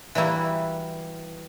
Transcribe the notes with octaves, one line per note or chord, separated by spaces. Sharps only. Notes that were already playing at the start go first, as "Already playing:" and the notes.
E3 G3 A#3 E4 F#4 G4